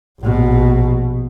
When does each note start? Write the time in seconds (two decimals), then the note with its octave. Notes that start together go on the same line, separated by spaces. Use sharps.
0.21 A#1 B2